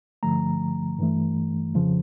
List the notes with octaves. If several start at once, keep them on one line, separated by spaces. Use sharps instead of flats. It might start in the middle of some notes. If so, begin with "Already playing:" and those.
G2 D3 F3 A3 A#5
G2 E3 A3
F2 C#3 F3